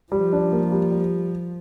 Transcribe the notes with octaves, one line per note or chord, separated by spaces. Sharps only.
F3 G3
D4
A#3
G3
G3